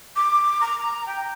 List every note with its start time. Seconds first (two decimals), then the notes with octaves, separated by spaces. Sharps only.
0.16 D6
0.61 A#5
1.07 G5